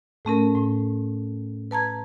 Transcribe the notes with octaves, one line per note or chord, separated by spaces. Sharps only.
A2 A3 C#4 A#4
A2
B4 A5 A#5 G#6